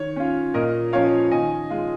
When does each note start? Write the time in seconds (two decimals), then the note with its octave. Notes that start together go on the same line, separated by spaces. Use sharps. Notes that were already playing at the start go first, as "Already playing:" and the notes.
Already playing: D#3 C#5
0.16 C#4 F4
0.54 A#2 A#4 D#5
0.92 F3 C#4 F4 C#5 F5
1.31 D#3 D#5 G#5
1.70 G#3 F4